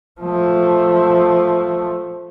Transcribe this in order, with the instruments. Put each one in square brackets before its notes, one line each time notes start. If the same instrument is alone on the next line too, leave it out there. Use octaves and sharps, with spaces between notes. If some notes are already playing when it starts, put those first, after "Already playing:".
[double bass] F3 A3